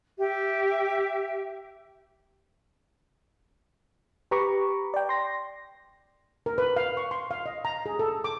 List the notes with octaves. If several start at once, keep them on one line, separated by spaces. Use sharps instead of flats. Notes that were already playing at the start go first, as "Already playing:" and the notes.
G4 E5
G4 B4 A#5 B5 C#6 D6
D5 G5
C6 A#6
A#4
B4
F5
C#6
C6
F5
D#5
A#5
G#4
A4
D6